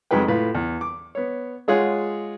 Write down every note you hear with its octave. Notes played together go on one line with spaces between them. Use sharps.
F2 F#3 G#3 D#4 B4 G5
A2 F4 B4
E2
D6
B3 C#5
G#3 F4 G#4 C#5 F#5